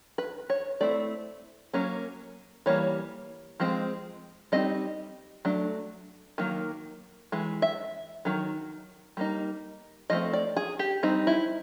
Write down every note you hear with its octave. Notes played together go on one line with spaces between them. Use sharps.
B4
C#5
A3 C4 E4 D5
F#3 A#3 C#4
E3 G3 A#3 C#5
F3 G#3 C4
G3 C4 D#4 D#5
F#3 A3 D4
D#3 F#3 A#3
E3 G#3
E5
D#3 F#3
G3 A#3 D#4
F3 A3 C4 D#5
D5
G#4
G4
G3 C4 D#4
E4